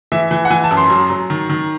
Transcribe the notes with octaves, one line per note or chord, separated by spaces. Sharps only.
E3 E5
E3
F#5
E3 G#5
A5
F#2
C6
F#3
F#3
D#3
D#3